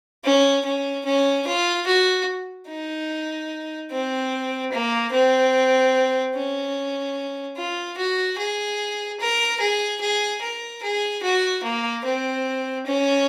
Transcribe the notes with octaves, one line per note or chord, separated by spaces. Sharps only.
C#4
C#4
C#4
F4
F#4
D#4
C4
A#3
C4
C#4
F4
F#4
G#4
A#4
G#4
G#4
A#4
G#4
F#4
A#3
C4
C#4